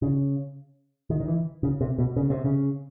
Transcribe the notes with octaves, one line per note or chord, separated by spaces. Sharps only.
C#3
D#3
D#3
E3
C#3
C3
B2
C#3
C3
C#3